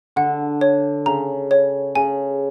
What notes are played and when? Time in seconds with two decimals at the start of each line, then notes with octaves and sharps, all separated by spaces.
0.16 D3 F#5
0.61 C#5
1.06 C#3 A#5
1.51 C#5
1.95 C#3 G#5